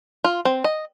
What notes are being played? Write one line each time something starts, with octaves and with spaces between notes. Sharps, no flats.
F4
C4
D#5